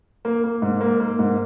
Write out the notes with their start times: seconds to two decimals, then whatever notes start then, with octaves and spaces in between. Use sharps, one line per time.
0.25 A#3
0.44 A#3
0.62 G#2
0.81 A#3
1.00 A#3
1.19 G#2